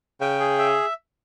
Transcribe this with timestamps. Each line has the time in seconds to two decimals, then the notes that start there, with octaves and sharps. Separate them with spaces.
0.21 C#3 G5
0.40 G#4
0.59 E5